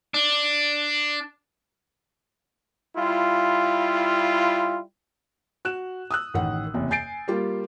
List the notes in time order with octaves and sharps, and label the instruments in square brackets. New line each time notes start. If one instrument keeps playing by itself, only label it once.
[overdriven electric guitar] D4
[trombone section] G3 E4 F4
[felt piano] F#4 F#6 E7
D#6 E6 F#6
A1 D#3 F#5
F#1 E2 C3
G#5 G6 A6 C7 D7
G3 A#3 F4 G4